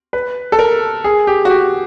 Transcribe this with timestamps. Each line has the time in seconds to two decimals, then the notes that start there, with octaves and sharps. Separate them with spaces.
0.13 B4
0.52 A4
0.59 A#4
1.04 G#4
1.27 G4
1.45 F#4
1.50 G4